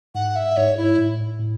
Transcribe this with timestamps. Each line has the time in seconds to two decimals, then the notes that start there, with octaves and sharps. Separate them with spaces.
0.15 G#2 F#5
0.36 E5
0.57 G#2 C#5
0.77 E4
0.98 A2
1.39 A2